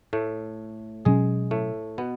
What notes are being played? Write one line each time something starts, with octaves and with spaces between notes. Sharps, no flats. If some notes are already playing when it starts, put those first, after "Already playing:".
A2 A3
B2 F#3 G#3 C#4 G#4
A2 A3
B2 B3